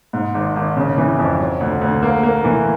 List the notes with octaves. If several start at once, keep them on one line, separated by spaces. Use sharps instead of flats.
G#2
G#1
G#1
C#3
E3
F2
F#3
D2
D2
A#3
A#3
E3